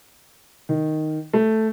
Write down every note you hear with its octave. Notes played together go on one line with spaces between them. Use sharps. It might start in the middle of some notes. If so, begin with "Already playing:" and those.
D#3
A3